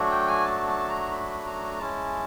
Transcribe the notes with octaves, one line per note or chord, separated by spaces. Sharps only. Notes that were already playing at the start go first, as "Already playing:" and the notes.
Already playing: F#3 A3 D4 F#4
G5
G#5
A5
A5
A#5
B5
A#5
G#3 C#4 E4 A5